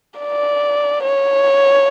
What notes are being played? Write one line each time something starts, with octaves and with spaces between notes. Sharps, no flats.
D5
C#5